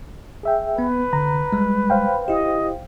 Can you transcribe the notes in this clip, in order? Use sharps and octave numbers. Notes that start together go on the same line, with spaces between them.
G#4 E5 G5
B3 B4
C2 D3 A#5
G3 G#3
C5 F5 G5
E4 G4 D#5